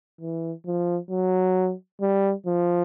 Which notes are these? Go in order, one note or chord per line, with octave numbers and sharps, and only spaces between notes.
E3
F3
F#3
G3
F3